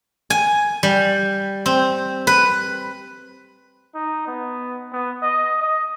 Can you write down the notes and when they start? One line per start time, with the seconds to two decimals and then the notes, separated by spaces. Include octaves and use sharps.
0.30 G#5
0.83 G3
1.66 C4
2.27 B4
3.94 D#4
4.27 B3
4.92 B3
5.23 D#5
5.62 D#5